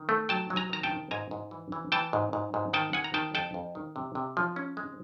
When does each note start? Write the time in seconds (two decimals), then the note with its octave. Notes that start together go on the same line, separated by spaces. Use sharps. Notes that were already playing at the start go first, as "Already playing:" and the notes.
Already playing: D#3
0.09 A3
0.29 F#3 G5 A5
0.50 F#3
0.56 G#5 A#5
0.70 D#3 A#5
0.83 G5 A5
0.91 D#3
1.11 G#2 G#5 A#5
1.31 G#2
1.51 E3
1.72 E3
1.92 E3 G5 A5
2.13 G#2
2.33 G#2
2.54 G#2
2.73 D#3 G5 A5
2.93 D#3 F#5 G#5
3.04 A#5
3.14 D#3 G5 A5
3.34 F2 G5 A5
3.54 F2
3.75 D#3
3.96 C3
4.15 C3
4.37 F3
4.56 C#4
4.77 G#3